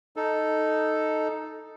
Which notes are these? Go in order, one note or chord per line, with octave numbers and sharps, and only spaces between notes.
D#4 A4